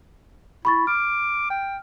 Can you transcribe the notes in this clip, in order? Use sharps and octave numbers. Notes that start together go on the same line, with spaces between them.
E4 B5 C#6 A6
D6 F6
G5